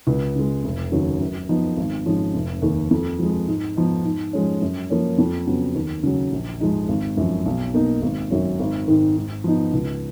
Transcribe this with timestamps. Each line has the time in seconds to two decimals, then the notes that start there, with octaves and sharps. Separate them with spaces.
0.07 C#2
0.35 C#3 G#3
0.64 F1
0.92 D#2 C#3 F#3
1.20 F#2
1.49 F3 B3 D#4
1.77 G#1
2.06 G#2 F3 G#3 C#4
2.34 F1
2.62 D#2 D#3 A#3
2.91 F2
3.19 F3 G#3
3.48 G#2
3.77 F3 B3 D#4
4.04 G#2
4.33 F3 G#3 C#4
4.62 F#2
4.90 F3 A#3 C#4
5.18 F2
5.47 C#3 F#3 B3
5.75 D#2
6.03 C#3 F#3
6.32 A#1
6.60 G#2 F3 G#3 D#4
6.89 G#1
7.17 F#2 F3
7.46 B1
7.74 B2 A#3 D#4
8.02 G#1
8.31 F#2 D#3 F#3 C#4
8.59 G#1
8.88 G#2 D#3
9.16 G#2
9.44 F3 B3 D#4
9.73 C#2